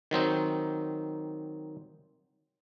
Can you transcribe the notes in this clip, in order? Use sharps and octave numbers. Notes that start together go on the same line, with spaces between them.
D#3 F#3 C4 D#4